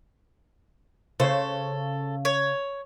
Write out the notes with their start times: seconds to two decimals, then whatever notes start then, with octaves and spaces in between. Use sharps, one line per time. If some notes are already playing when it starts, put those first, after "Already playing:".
1.20 C#3 A4 C5
2.25 C#5